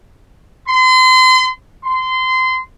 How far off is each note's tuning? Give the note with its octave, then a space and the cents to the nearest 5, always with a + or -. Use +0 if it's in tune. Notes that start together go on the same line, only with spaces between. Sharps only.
C6 -35
C6 -20